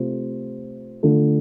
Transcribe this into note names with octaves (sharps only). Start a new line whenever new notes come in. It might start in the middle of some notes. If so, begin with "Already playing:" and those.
Already playing: C3 A3 F4 C5
D3 A3 F4 A4